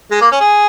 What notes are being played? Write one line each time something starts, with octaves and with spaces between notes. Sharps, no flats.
G#3
A#3
C#4
G#4